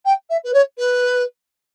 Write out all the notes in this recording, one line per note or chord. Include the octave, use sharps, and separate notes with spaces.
G5
E5
B4
C#5
B4